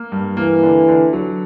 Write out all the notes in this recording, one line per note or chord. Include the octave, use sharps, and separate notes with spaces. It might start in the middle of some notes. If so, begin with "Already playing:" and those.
Already playing: A#3
G2
E3 A#3
D3
D3
F#3